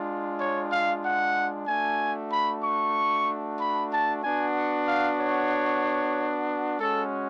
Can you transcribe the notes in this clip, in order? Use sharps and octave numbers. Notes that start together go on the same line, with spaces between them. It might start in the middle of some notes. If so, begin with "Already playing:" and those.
Already playing: G#3 D4 F4
C#5
F5
F#5
A3 D4 F#4 G#5
B5
C#6
B5
A5
B3 D4 F#4 G#5
F#5
F5
C#5
G#3 C#4 F#4 A4